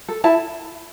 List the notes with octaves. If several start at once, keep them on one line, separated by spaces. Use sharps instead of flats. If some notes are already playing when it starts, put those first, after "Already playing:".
A4
E4 A5